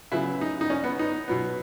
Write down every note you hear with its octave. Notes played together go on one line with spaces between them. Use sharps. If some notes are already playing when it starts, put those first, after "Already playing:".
C#3 F#3 B3 E4
D#4
D#4
C#4
B3
D#4
B2 F#3 B3